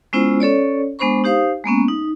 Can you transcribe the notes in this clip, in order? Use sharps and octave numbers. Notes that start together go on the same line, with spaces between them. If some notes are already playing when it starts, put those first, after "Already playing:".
G#3 B3 C#4 E4 F4 C5
C#4 A4 C#5 D5
G#3 B3 D4 C5 B5 C#6
D#4 G4 C5 F5 D#6
G#3 A#3 B3 C#4
D#4